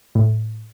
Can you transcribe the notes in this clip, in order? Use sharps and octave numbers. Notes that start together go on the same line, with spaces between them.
A2